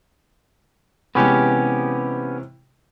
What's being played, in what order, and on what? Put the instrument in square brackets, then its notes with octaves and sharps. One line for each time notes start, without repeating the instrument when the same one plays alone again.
[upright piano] C3 E3 G#3 [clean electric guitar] B3 C#4 G4